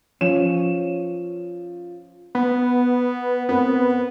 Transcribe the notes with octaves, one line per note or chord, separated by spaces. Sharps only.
F3 C#4 E7
B3
B3 C4 A#4